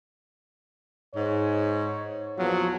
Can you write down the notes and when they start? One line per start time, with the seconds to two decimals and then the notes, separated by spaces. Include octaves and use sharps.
1.15 G#2 C#5
2.38 E2 A#2 F3 F#3